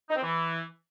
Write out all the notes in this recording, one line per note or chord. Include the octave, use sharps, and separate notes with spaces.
D#4
C4
E3